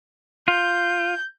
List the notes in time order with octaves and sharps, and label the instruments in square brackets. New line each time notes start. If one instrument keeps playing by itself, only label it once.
[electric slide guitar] F4 [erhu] G6